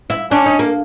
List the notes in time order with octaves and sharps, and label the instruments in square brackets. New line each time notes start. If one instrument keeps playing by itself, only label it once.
[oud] E4
[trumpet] C#4 [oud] D4
[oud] D#4
A#3